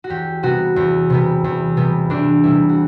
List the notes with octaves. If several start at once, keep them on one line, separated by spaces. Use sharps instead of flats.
F#4
E2 G4
C3 G3 B3 F#4
E2
C3 G3 B3
E2
C3 G3 B3
E2 D4
C3 G3 B3 E4
F#4